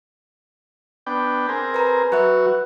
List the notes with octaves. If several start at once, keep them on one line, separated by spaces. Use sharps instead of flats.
B3 D4 G5
C4 G#4 A#4
B4 A#5
F#3 F#4 B4 E5